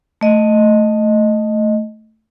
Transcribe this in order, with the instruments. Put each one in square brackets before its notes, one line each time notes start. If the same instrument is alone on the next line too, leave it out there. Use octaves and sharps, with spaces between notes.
[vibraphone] A3 D#5